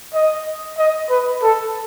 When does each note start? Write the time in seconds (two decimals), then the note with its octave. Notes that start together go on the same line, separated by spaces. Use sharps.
0.14 D#5
0.78 D#5
1.10 B4
1.42 A4